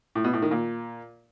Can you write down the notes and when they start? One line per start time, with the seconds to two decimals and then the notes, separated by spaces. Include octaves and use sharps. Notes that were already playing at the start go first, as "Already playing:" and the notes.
0.15 A2
0.24 B2
0.33 A2
0.42 D#3
0.51 A#2